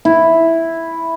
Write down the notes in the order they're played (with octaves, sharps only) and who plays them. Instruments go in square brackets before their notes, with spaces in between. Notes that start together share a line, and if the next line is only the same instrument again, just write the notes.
[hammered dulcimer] E4